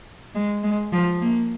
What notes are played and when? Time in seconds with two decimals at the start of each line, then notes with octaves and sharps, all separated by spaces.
0.35 G#3
0.63 G#3
0.93 F3
1.21 A#3